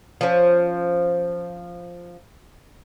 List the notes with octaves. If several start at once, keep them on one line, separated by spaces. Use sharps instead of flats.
F3 C#4